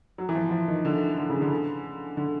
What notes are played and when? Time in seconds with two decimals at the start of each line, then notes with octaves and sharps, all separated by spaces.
0.18 F#3
0.29 E3
0.35 F3
0.51 F3
0.68 D#3
0.85 D3
1.18 D3
1.30 C#3
1.42 D3
2.17 D3